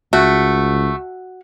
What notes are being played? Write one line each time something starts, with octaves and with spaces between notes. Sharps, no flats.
C#2 A3 F#4